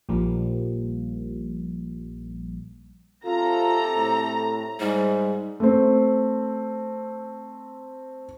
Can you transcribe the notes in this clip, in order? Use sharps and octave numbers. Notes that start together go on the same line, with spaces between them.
A#1 F3 G3 A#3
C3 C4 F4 A4 A#5
A2
G#2 G3
A3 C4